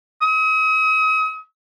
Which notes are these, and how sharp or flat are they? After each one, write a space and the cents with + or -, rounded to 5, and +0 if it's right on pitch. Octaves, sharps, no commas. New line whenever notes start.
D#6 +40